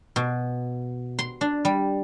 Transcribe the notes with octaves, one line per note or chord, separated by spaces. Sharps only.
B2
C6
D4
G3